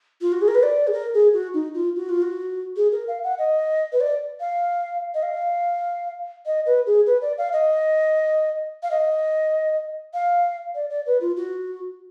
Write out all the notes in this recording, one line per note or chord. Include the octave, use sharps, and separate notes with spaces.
F4
F#4
G#4
A#4
B4
D5
G#4
A#4
G#4
F#4
D#4
F4
F#4
F4
F#4
G#4
A#4
F5
F#5
D#5
B4
D5
F5
D#5
F5
D#5
B4
G#4
B4
D5
F5
D#5
F5
D#5
F5
D5
D5
B4
F4
F#4